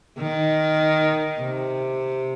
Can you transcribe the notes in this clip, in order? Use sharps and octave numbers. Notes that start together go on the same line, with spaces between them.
D#3
C3